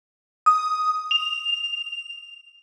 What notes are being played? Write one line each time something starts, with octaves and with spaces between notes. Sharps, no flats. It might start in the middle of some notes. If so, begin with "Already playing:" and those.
D#6
F7